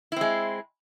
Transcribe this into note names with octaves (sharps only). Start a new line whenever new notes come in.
G#3 C4 E4